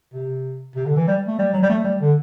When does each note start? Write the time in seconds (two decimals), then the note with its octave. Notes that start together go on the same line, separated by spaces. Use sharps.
0.14 C3
0.76 C3
0.86 D3
0.97 E3
1.08 G3
1.28 A3
1.39 G3
1.54 F#3
1.62 G3
1.70 A3
1.84 G3
2.01 D3